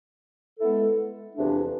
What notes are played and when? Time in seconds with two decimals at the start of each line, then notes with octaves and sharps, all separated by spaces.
0.60 G#3 B3 E4 A4
1.35 E2 C3 F3 A3 D4